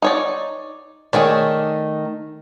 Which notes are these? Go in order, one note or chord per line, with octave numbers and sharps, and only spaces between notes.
D#4 C#5 D5
D#3 A3 D#4 G#4 C#5 D5